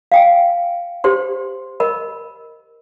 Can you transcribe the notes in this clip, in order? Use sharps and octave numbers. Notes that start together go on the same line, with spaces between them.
F5 G5 G#5
G4 C5 C6
A#4 D#5 B5